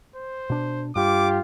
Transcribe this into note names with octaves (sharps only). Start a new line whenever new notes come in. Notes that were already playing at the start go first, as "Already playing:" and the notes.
C5
B2 D4
G2 F4 G4 D6